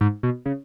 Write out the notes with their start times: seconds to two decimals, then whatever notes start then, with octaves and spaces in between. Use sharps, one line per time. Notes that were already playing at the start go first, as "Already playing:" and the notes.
0.01 G#2
0.23 B2
0.46 C#3